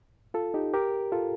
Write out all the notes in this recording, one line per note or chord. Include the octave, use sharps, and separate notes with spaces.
F4 A4
D#4 G4
G4 A#4
F4 A4